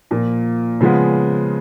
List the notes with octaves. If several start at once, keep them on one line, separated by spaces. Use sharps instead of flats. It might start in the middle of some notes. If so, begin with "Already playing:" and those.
A#2 F3 A#3
C#3 F3 G#3 B3